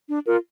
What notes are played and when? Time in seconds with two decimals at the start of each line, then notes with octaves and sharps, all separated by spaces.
0.09 D4
0.26 F4 A#4